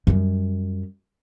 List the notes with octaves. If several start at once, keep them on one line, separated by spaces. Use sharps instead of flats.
F#2 G3